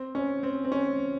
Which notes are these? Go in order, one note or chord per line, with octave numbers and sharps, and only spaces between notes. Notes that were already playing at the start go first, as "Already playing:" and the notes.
Already playing: C4
C#4
C4
C4
C#4